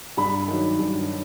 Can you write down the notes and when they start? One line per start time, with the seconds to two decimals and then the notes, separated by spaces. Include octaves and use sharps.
0.17 G2 B5
0.48 D#3 F#3
0.79 G2